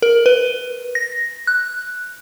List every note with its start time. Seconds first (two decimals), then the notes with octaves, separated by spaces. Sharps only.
0.02 A#4
0.26 B4
0.95 A#6
1.47 F#6